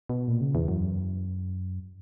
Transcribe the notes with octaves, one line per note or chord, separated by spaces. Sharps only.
B2
A#2
C#3
E2
F#2